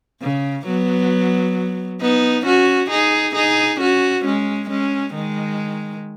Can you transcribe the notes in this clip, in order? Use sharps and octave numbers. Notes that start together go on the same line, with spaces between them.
C#3
F#3 B3
B3 D#4
C#4 F#4
D#4 G#4
D#4 G#4
C#4 F#4
G#3 C#4
G#3 C#4
D#3 G#3